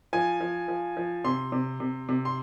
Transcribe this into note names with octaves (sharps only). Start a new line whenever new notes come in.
F3 G#5
F3
F3
F3
C3 C6
C3
C3
C3
C6